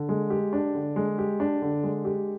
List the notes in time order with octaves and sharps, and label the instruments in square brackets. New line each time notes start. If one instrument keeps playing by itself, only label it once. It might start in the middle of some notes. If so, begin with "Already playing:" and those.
Already playing: [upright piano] D3
G#3
G4
D4
D3
G#3
G4
D4
D3
G#3
G4